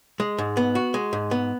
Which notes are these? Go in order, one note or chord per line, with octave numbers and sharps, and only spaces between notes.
G#3
G#2
B3
F#4
G#3
G#2
B3